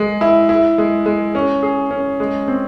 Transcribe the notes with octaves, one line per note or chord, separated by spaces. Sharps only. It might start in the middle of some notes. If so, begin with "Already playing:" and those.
Already playing: G#3
E4
E4
G#3
G#3
C#4
G#4
C#4
G#3
C4